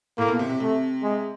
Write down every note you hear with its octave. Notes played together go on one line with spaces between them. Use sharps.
A2 A#3
B2
C3
C3
C3 A3
G#3